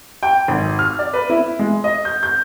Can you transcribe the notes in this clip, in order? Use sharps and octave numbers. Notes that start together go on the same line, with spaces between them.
G5
G#1
F6
D5
B4
E4
G#3
D#5
G6
G6